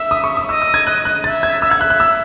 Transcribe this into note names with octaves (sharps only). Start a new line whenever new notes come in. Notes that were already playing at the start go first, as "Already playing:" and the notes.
Already playing: E5 E6
D#6
C#6
D#6
E5
D#5 E6
E6
G#6
F#6
F#6
E5 A6
G#6
E5 E6
F#5 G#6
E5 F#6
F#6
E6